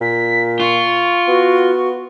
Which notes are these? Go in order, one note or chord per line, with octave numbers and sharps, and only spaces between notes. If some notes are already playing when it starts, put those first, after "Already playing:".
A#2 B6
F4 C#6
B3 F#4